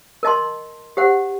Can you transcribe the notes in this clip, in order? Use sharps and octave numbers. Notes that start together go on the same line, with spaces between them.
A#4 D#5 A5 C6
G4 C5 F#5